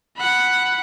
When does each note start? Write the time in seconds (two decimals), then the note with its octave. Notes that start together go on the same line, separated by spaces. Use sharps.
0.16 F#5 B5